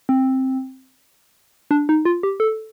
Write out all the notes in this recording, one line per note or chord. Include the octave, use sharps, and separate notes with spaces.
C4
D4
D#4
F4
G4
A4